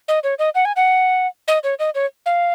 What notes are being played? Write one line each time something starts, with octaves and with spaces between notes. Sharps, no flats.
D#5
C#5
D#5
F#5
G#5
F#5
D#5
C#5
D#5
C#5
F5